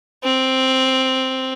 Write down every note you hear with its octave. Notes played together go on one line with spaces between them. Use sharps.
C4